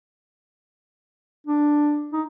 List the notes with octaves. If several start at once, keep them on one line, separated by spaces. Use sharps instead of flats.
D4
D#4